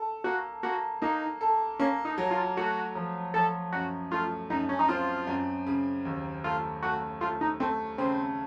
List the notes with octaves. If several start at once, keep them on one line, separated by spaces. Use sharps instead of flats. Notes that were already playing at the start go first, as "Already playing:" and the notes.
Already playing: A4
A#3 F#4
A#3 F#4
A#3 D#4
A4
A#3 C#4
D#4
F#3
F4
A3 F#4
F3
F3 A4
F#2 F#4
A3 F4
F#2 D#4
C#4
D#4
C4 F4
F#2
C#3
D#2
A3 F4
A3 F#4
A3 F4
D#4
A3 C4
C#3 C4